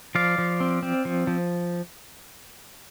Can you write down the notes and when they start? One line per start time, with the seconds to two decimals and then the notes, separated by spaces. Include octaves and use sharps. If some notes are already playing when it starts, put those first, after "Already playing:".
0.15 F3 D5 F5
0.38 F3
0.60 C4
0.83 C4
1.05 F3
1.27 F3